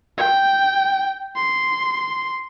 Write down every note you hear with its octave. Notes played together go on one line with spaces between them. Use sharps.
G5
C6